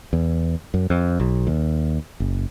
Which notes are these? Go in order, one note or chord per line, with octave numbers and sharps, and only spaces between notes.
E2
F#2
F2
B1
D#2
F#1